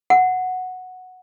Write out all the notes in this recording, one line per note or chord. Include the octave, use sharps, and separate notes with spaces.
F#5